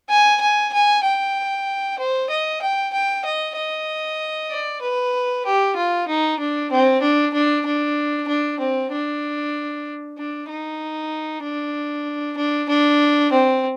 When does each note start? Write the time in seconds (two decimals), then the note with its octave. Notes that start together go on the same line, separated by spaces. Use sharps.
0.10 G#5
0.41 G#5
0.73 G#5
1.04 G5
1.99 C5
2.30 D#5
2.62 G5
2.93 G5
3.25 D#5
3.57 D#5
4.51 D5
4.82 B4
5.46 G4
5.76 F4
6.08 D#4
6.39 D4
6.71 C4
7.02 D4
7.33 D4
7.66 D4
8.28 D4
8.60 C4
8.92 D4
10.18 D4
10.49 D#4
11.43 D4
12.37 D4
12.69 D4
13.32 C4